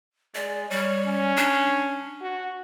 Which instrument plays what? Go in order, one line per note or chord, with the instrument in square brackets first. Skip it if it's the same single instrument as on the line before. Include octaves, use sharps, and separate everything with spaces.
[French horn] G#3 [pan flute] D5
[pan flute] G3 [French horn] C#5
[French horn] C#4
[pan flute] D4
[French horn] F#4